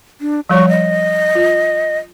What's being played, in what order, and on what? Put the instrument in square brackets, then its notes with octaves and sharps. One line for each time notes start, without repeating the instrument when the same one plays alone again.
[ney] D4
[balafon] F3 G3 C#5 [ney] C#6
[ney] D#5
[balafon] F4